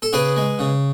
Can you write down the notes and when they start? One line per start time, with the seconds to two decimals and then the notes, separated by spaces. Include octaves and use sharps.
0.02 A4
0.13 C#3 G#4 B4
0.37 G#3
0.59 C#3